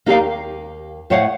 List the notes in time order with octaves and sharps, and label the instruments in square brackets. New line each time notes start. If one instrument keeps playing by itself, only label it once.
[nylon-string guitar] A#3 D#4 G4 G#4 A#4 F5
D#2
A2 C5 C#5 F5 F#5